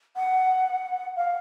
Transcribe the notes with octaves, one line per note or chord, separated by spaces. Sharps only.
F#5
F5